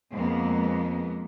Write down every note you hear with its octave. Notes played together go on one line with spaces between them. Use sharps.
F2 G#3 A#3 B3